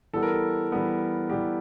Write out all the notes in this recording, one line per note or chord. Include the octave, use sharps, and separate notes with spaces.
E3 G3 B3 A4
A#4
A4
E3 G3 B3
E3 G3 B3 G4